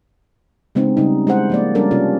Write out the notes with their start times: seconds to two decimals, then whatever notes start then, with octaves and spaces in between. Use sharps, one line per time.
0.75 C#3 G#3 B3 C4 D#4
0.97 C#3 G3 D#4
1.27 G#3 E4 G#4 C5 F#5
1.50 F3 A#3 D5
1.75 G3 C#4 D4 A4 A#4 D5
1.91 C3 C4 C#4 F4 A4